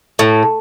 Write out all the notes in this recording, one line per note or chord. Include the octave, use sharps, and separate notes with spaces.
A2